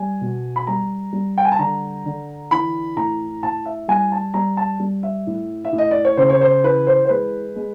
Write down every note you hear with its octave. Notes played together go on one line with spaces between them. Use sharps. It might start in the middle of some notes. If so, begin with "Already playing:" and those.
Already playing: G3 G#5
B2
B5
G3 A#5
G3
G5
G#5
A5
D3 A#5
D3
E3 B5
A2 A#5
A2 A5
E5
G3 G#5
A5
G3 A#5
A5
G3
E5
A2
E5
A2
D#5
D5
C#5
C#3 C5
C#5
C5
E3 B4
C5
C5
G#3 B4
G#3